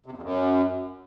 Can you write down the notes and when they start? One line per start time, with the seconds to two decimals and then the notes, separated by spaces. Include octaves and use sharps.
0.06 C3
0.12 E2
0.17 F2
0.23 F#2